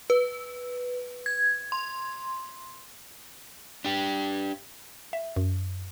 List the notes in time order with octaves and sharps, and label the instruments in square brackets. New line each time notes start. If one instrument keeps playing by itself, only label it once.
[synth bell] B4
G#6
C6
[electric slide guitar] D4 G4
[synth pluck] E5
F#2